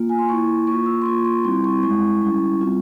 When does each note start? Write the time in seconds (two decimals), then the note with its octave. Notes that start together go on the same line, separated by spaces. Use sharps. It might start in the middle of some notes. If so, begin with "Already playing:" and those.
Already playing: A#3 F4
0.09 G#5
0.19 C6
0.29 A#3 E4 C#6
0.67 A#3 F4 C#6
0.86 E6
1.02 C6
1.05 A#3 F4 C#6
1.25 C6
1.44 G3 C4 E4 C6
1.64 C#6
1.83 G#3 E4 C#6
2.22 G3 C#4 E4
2.60 G3 C4 F4